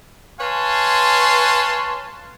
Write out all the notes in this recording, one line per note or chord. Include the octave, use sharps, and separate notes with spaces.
B4 C#5 F5 G#5 A5 C6